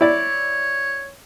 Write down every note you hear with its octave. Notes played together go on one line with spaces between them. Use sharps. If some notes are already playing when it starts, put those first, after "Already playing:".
E4 C#5 D5